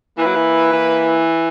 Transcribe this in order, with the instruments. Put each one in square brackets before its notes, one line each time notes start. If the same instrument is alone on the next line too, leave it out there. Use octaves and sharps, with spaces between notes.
[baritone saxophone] E3 [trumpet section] A#3 E4 B4
[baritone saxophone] F#3
E3
E3